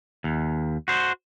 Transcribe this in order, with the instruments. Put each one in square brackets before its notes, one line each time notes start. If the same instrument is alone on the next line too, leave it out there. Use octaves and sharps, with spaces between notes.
[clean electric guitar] D#2
F#4 C5